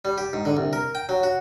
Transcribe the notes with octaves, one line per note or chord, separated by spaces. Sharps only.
G3
G4
G#2
D3
C2
A#4
G5
F#3
F#4